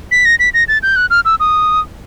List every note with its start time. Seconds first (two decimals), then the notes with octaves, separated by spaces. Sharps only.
0.11 B6
0.25 A#6
0.39 B6
0.54 A#6
0.68 A6
0.83 G6
0.96 F#6
1.10 F6
1.25 E6
1.40 D#6